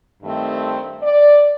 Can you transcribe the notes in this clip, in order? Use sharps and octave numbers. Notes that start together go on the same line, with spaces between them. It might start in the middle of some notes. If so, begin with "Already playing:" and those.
G2 D#3 A3 C4
D5